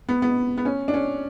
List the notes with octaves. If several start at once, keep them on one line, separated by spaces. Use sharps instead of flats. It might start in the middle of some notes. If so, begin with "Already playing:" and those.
B3
B3
B3
C#4
D4
C#4